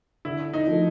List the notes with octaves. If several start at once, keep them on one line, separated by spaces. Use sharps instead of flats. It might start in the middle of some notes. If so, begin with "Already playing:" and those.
D3 E4
D#4
F3 A3